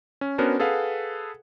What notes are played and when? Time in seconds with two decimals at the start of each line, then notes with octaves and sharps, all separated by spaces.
0.21 C#4
0.38 B3 C#4 D4 F#4 A#4 C5
0.59 G#4 A4 B4 F5 F#5